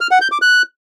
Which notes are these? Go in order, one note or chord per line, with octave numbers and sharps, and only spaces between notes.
F6
F#5
G6
D6
F#6